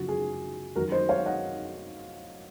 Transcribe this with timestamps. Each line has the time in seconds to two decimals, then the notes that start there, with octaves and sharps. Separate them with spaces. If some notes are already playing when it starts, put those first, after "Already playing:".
Already playing: F#2 C#3 F3 F#4
0.09 G#4
0.76 F#2 D#3 F#3 F#4 A#4
0.92 C5 D#5
1.09 C#5 F5
1.26 D#5 F#5